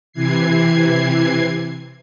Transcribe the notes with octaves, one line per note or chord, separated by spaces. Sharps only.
C3 E3 G#6 C7